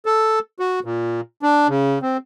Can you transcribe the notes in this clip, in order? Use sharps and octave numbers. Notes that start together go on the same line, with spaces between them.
A4
F#4
A#2
D4
C#3
C4